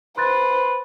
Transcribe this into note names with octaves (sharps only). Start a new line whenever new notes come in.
B4 C5 C6 F#6 A6